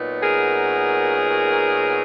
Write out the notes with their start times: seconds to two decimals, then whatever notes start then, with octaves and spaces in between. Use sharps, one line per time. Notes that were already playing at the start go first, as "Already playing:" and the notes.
Already playing: A#2 F#3 B3 D#4
0.22 G#4 A#4